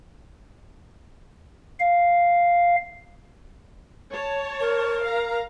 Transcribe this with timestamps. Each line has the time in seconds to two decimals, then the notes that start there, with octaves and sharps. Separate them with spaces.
1.79 F5
4.13 C#5 A5
4.61 A#4
5.04 F5 A#5